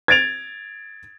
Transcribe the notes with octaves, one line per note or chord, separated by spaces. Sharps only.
G#6 A6 D7 F7